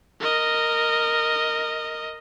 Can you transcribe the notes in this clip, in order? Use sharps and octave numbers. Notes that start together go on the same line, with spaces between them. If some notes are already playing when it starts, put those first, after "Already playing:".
A#4 D#5